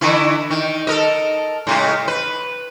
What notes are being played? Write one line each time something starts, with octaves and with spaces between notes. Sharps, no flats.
D3 E3 E4
D#3
A4 A#4 D#5
A2 C#3 G#3
B4